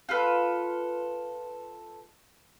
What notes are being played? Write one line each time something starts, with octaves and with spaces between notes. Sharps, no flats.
F4 A4 B4